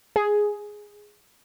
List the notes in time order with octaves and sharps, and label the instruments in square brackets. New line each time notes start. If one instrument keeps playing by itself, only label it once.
[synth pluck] G#4